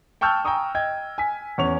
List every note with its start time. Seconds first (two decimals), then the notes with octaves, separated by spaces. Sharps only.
0.21 G5 A5 C#6 E6 F6 G6
0.45 G5 G#5 A#5 C#6 D#6
0.75 D#5 G5 G#6
1.18 G#5 B6
1.58 E2 C#4 C#6 F7